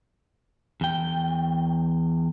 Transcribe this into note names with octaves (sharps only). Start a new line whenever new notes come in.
E2 G5